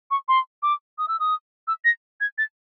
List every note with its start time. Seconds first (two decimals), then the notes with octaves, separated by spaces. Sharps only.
0.11 C#6
0.28 C6
0.63 D6
0.98 D#6
1.08 E6
1.20 D#6
1.68 E6
1.85 A#6
2.21 G#6
2.38 A6